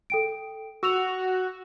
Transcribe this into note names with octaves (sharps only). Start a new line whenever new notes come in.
A4 G5 D7
F#4 E6 F7